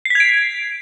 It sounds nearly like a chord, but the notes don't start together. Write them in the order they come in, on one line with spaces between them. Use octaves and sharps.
C7 B6 G#6 D7